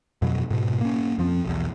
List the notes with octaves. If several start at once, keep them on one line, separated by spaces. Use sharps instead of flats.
F2 B2 F#3
G#2 B2
A#3 C#4
F2 F3 C4
B1 E2